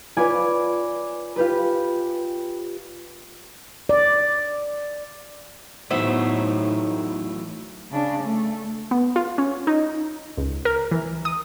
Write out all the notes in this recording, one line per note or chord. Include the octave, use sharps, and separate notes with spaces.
F4 B4 C#5 D5 G#5
F4 G4 B4
D5
A2 E3 F#3 A3 B3 D#4 C5 E5
C#3 D4
A3
B3
F4
C#4
D#4
C#2
A#4
E3
D#6